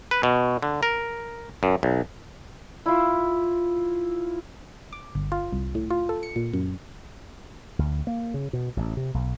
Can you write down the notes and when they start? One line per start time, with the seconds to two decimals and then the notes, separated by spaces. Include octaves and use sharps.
0.11 B4
0.23 B2
0.62 D3
0.83 A#4
1.63 F#2
1.83 B1
2.86 E4 F4
4.93 D6
5.15 G1
5.32 F4
5.52 C2
5.75 A2
5.90 F4
6.09 A4
6.23 C#7
6.36 A#2
6.53 F#2
7.79 D2
8.07 A#3
8.34 C#3
8.53 B2
8.77 A1
8.97 C3
9.14 B1